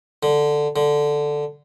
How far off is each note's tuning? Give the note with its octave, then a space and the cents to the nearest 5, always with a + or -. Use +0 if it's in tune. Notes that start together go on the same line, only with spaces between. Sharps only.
D3 +5
D3 +0